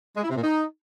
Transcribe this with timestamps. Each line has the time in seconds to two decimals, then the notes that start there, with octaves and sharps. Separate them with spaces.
0.17 G#3
0.23 E4
0.30 C3
0.37 A#2
0.43 D#4